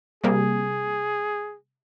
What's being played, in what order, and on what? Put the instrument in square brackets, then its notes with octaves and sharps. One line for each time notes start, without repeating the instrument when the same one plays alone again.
[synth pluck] C3 G3 A#3 [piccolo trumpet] G#4